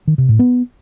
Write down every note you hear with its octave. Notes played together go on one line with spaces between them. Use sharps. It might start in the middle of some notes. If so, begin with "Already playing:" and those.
D#3
C3
A2
B3